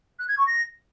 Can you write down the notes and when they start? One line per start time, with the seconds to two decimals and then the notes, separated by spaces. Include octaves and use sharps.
0.19 F#6
0.28 G#6
0.38 C#6
0.47 A#6